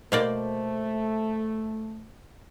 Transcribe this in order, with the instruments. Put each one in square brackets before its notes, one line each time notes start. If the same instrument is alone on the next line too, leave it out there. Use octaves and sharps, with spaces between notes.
[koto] B2 A#3 D5 [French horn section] A3 [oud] C5